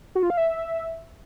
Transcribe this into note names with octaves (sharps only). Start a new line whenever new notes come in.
F#4
F4
F5
E5